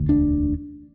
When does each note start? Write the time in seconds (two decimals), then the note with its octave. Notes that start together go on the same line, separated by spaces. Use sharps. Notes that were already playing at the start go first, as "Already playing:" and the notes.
Already playing: E1 D2 D3
0.09 D4